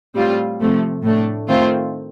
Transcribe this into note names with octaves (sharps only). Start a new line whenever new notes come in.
A2 G3 C4 F4
C3 F3 A3
A2 A3 D4
D#3 A3 C4 F4